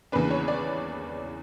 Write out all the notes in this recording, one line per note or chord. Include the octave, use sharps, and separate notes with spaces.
E2 C#3 E3 A#3 D4 B4
C#5
D5